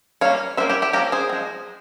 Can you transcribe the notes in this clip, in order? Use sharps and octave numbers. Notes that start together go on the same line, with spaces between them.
E3 G3 A#3 C#5 F5
G3 A#3 C#4 C5 E5
E4 G4
E4 G4
F3 A#3 C#4 G4 A#4
G#4 C5
C4
F3 G#3